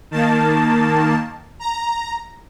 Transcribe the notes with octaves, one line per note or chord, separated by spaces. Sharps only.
D#3 A#3 A5
A#5